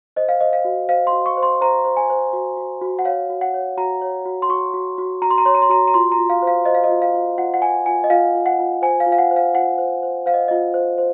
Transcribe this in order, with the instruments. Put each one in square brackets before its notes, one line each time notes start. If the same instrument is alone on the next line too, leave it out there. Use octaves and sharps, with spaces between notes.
[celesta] C5 D#5
F5
C5 D#5
F5
F#4
C5 F5
C6
F#4
C#6
C5
C6
C5 A#5
C5
G#5
C5
F#4
F#4
F#4
F#5
C#5 F5
F#4
F#5
C#5
F#4 A#5
C#5
F#4
C6
F#4 C#6
F#4
F#4
F#4 A#5
C6
A#5
C#5 C6
A#5
C6
F#4 A#5
A#5
F4 C6
A#5
F4
F5
C5
F5
C5 D#5
F5
D#5
F4
F5
F4
F4 F#5
F#5
F4 G#5
F4 G#5
D#5
F4 F5
F4
F#5
F4
C5 G#5
F5
F4
F5
F#5
C5
F5
F4 F#5
C5
C5
C5 F5
D#5
F4 D#5
C5
C5